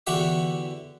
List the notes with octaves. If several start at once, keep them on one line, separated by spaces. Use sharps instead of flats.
E2 D3 F#4 G4 E5 D6